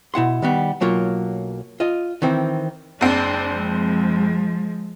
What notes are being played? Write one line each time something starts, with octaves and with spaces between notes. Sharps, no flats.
B2 E4 F#5 C6
D#3 G3 B3
B1 F#3 A#3 F4
F4 D#5
D#3 E3 C4
F#1 C4 D4
F3 G#3